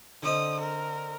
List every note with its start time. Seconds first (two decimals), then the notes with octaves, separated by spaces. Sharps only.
0.23 D3 C4 D#5 D#6
0.60 A#4